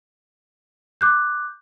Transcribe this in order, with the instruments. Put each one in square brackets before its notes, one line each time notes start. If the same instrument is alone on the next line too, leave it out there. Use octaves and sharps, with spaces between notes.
[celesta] D6 F#6 G6